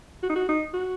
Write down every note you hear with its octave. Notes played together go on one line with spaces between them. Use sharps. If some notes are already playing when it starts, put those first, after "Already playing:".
F#4
D#4
F#4
D#4
F#4